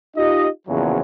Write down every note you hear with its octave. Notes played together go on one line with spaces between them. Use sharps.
D#4 F4 G4 D#5
E2 A#2 C#3 F3 F#3